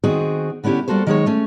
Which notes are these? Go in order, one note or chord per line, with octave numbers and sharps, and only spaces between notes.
D#3 C4 F#4 G#4
D3 B3 C#4 E4 G4
G3 A#3 F#4 A4 C5
D#3 F#3 G#3 G#4 C5 C#5
A3 C#4